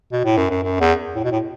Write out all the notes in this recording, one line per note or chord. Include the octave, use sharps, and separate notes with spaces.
B2
A2
F#2
F#2
F#2
E2
A2
B2
A2